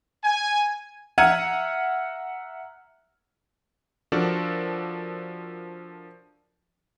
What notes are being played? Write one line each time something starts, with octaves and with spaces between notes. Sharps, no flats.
G#5
E5 F#5 A#5 F6 G#6 D#7
F3 D4 F#4 A4 A#4 D5